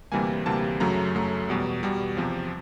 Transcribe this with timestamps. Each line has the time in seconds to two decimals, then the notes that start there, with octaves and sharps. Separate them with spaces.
0.12 D2 C3 E3 G3 A#3 G#5
0.46 D2 C3 E3 G3 A#3 A5
0.80 F#2 C#3 F#3 A3 A#5
1.15 F#2 C#3 F#3 A3
1.49 E2 B2 G3
1.83 E2 B2 G3
2.17 E2 C3 F3